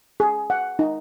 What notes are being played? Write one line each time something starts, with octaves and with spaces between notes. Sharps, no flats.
G#4
F#5
D#4